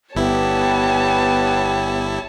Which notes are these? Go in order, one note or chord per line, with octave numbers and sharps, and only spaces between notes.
G1 B3 E4 G4 C#5 A5